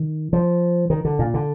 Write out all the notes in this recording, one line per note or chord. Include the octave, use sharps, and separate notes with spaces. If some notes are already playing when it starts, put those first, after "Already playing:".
Already playing: D#3
F3
D#3
D3
A#2
D3